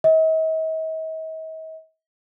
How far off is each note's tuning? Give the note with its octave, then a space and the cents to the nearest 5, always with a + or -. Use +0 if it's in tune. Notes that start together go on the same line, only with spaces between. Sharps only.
D#5 +45